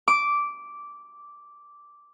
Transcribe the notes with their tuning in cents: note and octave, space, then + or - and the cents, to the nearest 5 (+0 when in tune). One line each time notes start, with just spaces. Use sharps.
D6 -10